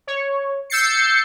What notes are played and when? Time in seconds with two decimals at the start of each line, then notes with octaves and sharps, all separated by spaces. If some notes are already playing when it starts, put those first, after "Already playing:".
0.07 C#5
0.70 E6 G6 A6 C7 C#7